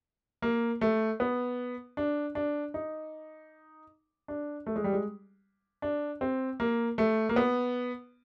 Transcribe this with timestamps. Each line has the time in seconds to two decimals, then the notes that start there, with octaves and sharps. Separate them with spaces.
0.42 A#3
0.81 A3
1.20 B3
1.97 D4
2.35 D4
2.74 D#4
4.28 D4
4.67 A3
4.76 G#3
4.84 G3
4.93 G#3
5.82 D4
6.21 C4
6.60 A#3
6.98 A3
7.29 A#3
7.36 B3